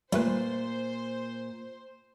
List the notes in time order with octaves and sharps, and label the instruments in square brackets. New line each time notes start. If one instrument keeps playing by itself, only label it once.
[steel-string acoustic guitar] A#2 [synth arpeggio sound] G3 A3 B4 [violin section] C5